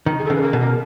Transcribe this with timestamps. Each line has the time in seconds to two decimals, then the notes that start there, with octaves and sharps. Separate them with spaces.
0.06 D#3
0.19 G#4
0.24 A4
0.30 C#3
0.35 B4
0.42 A#4
0.53 B2
0.60 A#4